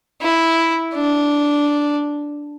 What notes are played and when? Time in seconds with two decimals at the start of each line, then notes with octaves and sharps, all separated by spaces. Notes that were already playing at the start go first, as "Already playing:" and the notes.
0.22 E4
0.94 D4